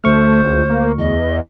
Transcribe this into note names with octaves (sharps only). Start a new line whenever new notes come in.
D2 A3 C5 C#6 F6
C#2
A#3
E2 D#5